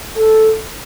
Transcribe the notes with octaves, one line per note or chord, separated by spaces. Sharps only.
A4